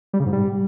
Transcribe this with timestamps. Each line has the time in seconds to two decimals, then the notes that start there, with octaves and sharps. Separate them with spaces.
0.13 G3
0.20 C#3
0.26 G#2
0.33 G3